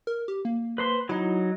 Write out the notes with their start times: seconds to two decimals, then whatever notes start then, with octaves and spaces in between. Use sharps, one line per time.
0.07 A#4
0.28 G4
0.45 A#3
0.78 B4 C5 C6
1.09 F#3 D#4 E4